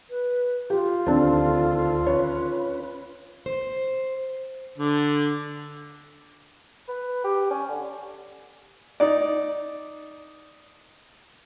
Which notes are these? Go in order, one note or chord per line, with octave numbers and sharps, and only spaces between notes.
B4
F4 G4
D2 D#3 C4 D4 A4
C#4 B4 C#5
C5
D3
B4
G4
C#4
D3
D#4 D5